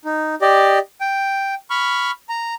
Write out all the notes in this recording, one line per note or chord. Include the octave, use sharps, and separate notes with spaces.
D#4
G4 D5 D#5
G5
B5 C#6 F6
A#5